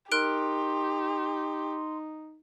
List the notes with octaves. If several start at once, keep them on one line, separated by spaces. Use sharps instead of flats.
D#4 G4 A#4 C6 F#6 D7